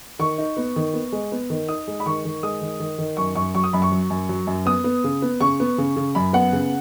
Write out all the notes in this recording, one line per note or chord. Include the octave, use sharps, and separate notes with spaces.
D#3 C#6
D#4
B3
D#3
B3
G#3
B3
D#3
D#4 D#6
G#3
B5
D#3 C#6
D#3
G#3 D#6
D#3
D#3
D#3
F#2 C#6
F#2 C#6
F#3 C#6
D#6
F#2 B5
C#6
F#3
F#2
F#3
F#2
B3 D#6
B3
C#3
B3
C#3 C#6
B3
C#3
C#3
F#2 B5
B3 F#5
C#3